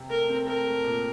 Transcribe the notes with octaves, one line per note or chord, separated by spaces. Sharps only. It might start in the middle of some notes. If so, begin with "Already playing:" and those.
Already playing: C3
A3 A#4
C4
A3 A#4
A3
A#2